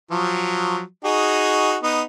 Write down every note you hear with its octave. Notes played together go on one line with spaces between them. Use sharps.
F3 F#3
D#4 F#4 G#4
B3 D#4